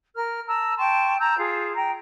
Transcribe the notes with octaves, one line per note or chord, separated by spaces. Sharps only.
A#4 F6
A5 A#5 E6
G5 A5 C6 C#6
A5 A#5 E6 G6
F4 G#4
G5 A#5